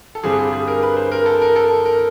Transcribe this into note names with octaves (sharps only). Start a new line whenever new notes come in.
A4
G2 D3 G3 C4 G#4
G#4
G#4
A#4
B4
C5
A#4
A4
A#4
A4
A#4